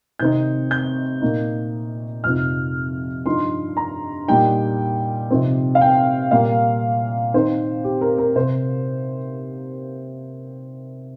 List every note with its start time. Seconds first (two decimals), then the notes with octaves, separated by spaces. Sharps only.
0.19 C3 D#3 C4 D#4 G6
0.71 G6
1.21 A#2 A#3 D#4
2.24 F2 C3 F3 D#4 F6
3.26 G2 F3 D#4 C6
3.77 A#5
4.28 A#2 G3 D#4 G5
5.30 C3 F3 C4 D#4
5.75 F5
5.81 G5
6.31 A#2 G3 A#3 F5
7.34 D#3 C4 D#4 C5
7.84 G4
8.01 A#4
8.18 A#4
8.36 C3 C5